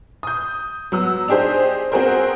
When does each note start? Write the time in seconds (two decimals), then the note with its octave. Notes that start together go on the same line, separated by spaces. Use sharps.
0.23 D#6 G6
0.92 F#3 B3 E6
1.28 D4 D#4 G4 G#4 C5
1.92 B3 C4 F#4 G#4 A#4 C5